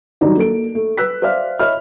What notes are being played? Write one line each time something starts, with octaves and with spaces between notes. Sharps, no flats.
D#3 F#3 G3 D#4 G4 D5
A#3 D#4 A4 D7
A3
B4 E6 F#6 B6
C5 D5 E5 F5 F6
C#5 D#5 E5 B5 F6